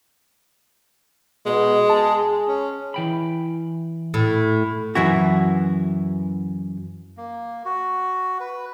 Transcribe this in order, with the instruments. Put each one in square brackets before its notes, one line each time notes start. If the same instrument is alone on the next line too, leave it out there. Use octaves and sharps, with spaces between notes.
[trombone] B2 [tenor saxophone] G#3
[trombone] G#4 [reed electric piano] A5
[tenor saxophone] C#4
[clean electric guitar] E3 G5 B5
[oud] A2
[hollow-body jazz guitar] F#2 E3 E4 F#4
[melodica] A#3
F#4
B4